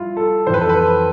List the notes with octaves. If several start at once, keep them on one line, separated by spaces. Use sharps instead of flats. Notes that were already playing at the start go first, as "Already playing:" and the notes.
Already playing: G2 F3 E4 F4
A4
F2 E3 B4 C5
A4
B4